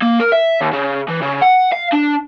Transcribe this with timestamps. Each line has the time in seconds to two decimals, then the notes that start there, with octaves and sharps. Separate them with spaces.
0.02 A#3
0.20 A#4
0.33 E5
0.61 D#2
0.73 C#3
1.08 E3
1.22 C#3
1.41 F#5
1.72 F5
1.93 D4